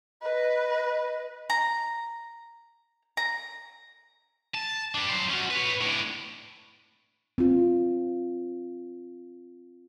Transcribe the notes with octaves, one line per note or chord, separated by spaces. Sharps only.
B4 D#5
A#5
A#5
A5
G3 D4
F#3 C5
C#4 F#4
B4 C#5
A2 D3
C4 F4